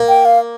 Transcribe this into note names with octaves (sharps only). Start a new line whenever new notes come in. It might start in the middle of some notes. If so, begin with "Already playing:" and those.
Already playing: A#3
G5
F5